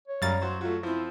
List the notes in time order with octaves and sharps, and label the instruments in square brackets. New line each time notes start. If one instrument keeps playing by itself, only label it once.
[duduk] C#5
[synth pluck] F#2 A6 [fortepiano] G3 F5 A#5
[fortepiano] F#3 C5
[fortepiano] F#3 A3 [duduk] F4
[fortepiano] F3 C4 [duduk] E4